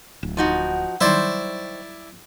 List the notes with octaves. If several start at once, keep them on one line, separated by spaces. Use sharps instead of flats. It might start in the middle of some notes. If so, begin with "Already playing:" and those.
D1
F3 D#4 F#4
D#3 F#3 G3 E4 C5 D5